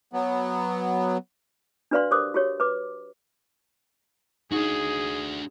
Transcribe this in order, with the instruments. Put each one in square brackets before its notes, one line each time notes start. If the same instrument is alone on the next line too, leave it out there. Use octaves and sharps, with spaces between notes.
[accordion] F#3 B3
[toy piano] D4 F#4 B4 D5 F5 C6
G4 A#4 C5 D6 D#6
F#4 G4 C#5
B4 D6
[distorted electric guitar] D4 F#4 [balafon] D#4 [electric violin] G#4